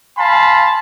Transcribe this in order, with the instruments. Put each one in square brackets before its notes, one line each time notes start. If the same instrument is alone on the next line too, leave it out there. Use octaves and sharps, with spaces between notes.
[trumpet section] F5 G#5 A5 B5 C6